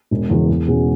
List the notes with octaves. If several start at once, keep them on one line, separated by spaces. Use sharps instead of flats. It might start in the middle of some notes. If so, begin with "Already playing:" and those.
E1
E2 C#3 E3
E2
B2 G#3 C#4 F#4